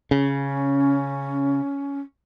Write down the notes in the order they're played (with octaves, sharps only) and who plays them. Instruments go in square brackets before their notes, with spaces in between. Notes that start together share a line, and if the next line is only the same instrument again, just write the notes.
[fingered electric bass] C#3 [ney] C#4